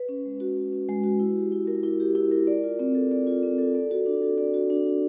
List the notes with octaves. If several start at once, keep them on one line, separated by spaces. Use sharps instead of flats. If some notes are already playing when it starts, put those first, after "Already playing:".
Already playing: B4
C#4
G#3
F#4
B4
C#4
G#3
F#4
E4
G4
E4
A#4
E4
G4
E4
A#4
D5
F4
C4
A4
D5
F4
C4
A4
D5
F#4
D4
A4
D5
F#4
D4
A4